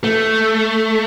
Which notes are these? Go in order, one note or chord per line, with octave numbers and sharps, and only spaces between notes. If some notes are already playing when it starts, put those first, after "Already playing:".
A3